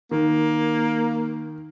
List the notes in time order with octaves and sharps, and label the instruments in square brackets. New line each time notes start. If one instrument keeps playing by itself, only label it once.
[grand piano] D#3 [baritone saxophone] A#3